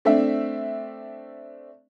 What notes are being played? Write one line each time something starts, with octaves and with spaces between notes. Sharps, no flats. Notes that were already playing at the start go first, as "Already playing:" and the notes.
A3 C4 D4 E5